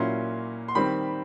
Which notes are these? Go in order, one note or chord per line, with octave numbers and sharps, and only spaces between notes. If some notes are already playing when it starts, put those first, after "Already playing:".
Already playing: A#2 F#3 A#3 C#4 E4 C6
C6
D#3 G3 C4 B5